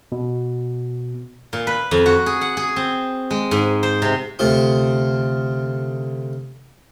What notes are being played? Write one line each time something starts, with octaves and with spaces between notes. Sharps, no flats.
B2
A#2
B4
F2
F#4
G#4
F#5
G#4
C4
G#3
G#2
C5
C3
D2 C3 F4